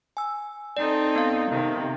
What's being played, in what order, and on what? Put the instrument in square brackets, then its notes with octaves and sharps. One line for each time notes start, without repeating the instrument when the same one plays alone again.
[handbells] G#5 E6
[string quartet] C4 D#4 A4 [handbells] D5
[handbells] B3 F5
[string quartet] C3 D#3